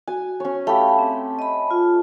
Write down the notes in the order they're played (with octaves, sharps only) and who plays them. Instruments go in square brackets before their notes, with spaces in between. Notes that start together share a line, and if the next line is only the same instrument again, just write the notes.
[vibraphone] F#4 [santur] G#5
[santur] C#4 C#5
[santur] A3 G4 [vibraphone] F5 G5 B5
[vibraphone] C4
D#5 B5
F4